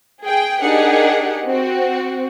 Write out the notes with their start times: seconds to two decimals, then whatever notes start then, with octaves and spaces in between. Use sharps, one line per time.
0.23 G#4 G5
0.61 D4 D#4 G4 G#4 A#4 F#5
1.47 C4 F#4